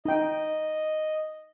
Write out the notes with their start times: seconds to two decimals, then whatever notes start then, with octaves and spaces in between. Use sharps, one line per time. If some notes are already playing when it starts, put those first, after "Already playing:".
0.05 D#4 D#5 G5